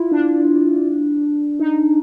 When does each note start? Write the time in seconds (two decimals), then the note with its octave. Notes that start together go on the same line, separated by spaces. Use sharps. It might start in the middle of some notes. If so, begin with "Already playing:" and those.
Already playing: E4 F4
0.12 D4
1.59 D#4